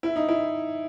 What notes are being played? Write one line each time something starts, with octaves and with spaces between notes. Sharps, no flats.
E4
D#4
E4